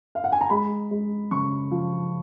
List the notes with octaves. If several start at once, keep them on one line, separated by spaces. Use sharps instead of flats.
F5
F#5
G#5
A#5
G#3 B5
G#3
C#3 C#6
F3